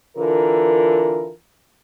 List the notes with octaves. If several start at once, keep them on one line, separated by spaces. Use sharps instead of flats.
D3 E3 F4 A#4